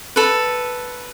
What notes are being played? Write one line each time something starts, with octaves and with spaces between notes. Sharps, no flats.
A4 B4